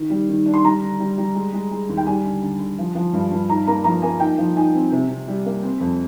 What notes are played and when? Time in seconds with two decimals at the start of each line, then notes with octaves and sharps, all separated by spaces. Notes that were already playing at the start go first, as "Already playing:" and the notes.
Already playing: D#3
0.10 G3
0.29 D#3
0.46 D4
0.54 C6
0.64 G3 A#5
0.82 D3
1.00 G3
1.18 G3
1.35 G#3
1.53 G#3
1.71 G#3
1.89 D#2
1.97 G5
2.06 G3 G#5
2.25 D3
2.42 D3
2.59 D3
2.78 F3
2.95 F3
3.13 G2
3.32 G2
3.49 D#4 A#5
3.67 A#3 A#5
3.84 F3 A#5
4.02 A#3 G#5
4.20 D#4 G5
4.38 F3
4.56 D#4 G#5
4.74 C4
4.92 C3
5.09 C3
5.28 G3
5.46 A#3
5.63 C4
5.80 F2